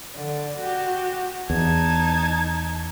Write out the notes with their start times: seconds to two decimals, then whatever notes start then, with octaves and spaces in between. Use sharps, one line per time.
0.14 D3
0.58 F#4 G4
1.50 E2 D#4 A5 G#6